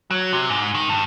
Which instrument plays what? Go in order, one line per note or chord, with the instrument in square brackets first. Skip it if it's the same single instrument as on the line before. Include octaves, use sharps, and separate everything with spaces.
[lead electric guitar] F#3
C3
G#2
D#3
G2